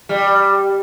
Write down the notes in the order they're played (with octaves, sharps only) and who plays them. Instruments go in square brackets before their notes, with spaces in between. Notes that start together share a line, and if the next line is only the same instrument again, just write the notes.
[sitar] G3